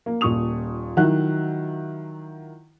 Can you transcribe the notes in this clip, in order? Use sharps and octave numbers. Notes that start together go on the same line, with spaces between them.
A#3
D#1 A#2 C#6 D#6 F7
D#3 F3 F#3 E4 F#5 F#6